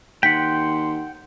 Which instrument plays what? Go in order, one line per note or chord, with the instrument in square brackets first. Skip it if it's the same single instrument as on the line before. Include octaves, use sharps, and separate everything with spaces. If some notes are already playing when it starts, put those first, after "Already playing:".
[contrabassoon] D#2 [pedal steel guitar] F#5 G5 [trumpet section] C6 [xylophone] B6